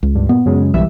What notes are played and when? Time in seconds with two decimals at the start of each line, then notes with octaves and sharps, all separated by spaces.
0.03 C#2
0.15 G2
0.29 A#2 B3
0.46 F#2 C#3 G#3
0.74 B1 E3 G3 E5